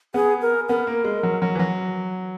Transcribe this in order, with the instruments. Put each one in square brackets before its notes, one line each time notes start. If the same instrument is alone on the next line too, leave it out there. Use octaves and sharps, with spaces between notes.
[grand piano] B3 [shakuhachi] G#4
[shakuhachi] A#4
[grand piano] B3 [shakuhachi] A#4
[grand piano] A#3
G#3
F#3
F#3
E3
F#3